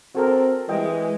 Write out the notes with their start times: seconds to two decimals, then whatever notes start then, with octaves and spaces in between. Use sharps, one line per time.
0.15 C4 F#4 A4 A#4
0.69 E3 G#3 D#5 G5